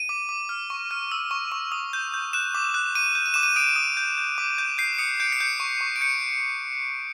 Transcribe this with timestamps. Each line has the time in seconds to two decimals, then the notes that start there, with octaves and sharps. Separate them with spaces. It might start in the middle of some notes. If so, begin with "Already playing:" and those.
Already playing: D#7
0.09 D6
0.29 D6
0.49 F6
0.70 C#6
0.91 F6
1.12 E6
1.31 C#6
1.52 C#6
1.72 D#6
1.93 G6
2.14 G6
2.33 F#6 E7
2.55 D6
2.74 F#6
2.95 D6 D#7
3.15 G6
3.26 D#7
3.34 D6 E7
3.43 D#7
3.56 D#6 D7
3.76 D#6
3.97 G6
4.18 G6
4.38 D6
4.58 G6
4.78 G6 C7
4.99 D#6 C#7
5.20 G6 D7
5.32 C7
5.41 G6 C#7
5.60 C#6
5.81 C#6
5.96 D7
6.01 G6 C#7